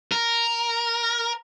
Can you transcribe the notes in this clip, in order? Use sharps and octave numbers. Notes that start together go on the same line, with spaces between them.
A#4